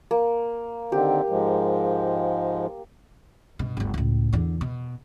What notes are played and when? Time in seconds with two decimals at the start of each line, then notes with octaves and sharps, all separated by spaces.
0.11 A#3
0.92 D3 D#3 C4 G4
1.30 G#2 F3 G#3
3.59 G2 B2
3.77 G1 D2
3.94 C#2 A2
4.33 E2 D3
4.61 B2